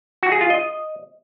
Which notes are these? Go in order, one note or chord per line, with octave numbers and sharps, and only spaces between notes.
F#4
G#4
F4
D#5